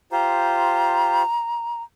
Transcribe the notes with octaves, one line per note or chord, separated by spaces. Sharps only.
F4 G4 C5 A#5